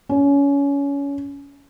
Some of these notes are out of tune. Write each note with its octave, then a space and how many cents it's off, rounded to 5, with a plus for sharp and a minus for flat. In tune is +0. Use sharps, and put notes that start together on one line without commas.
C#4 +25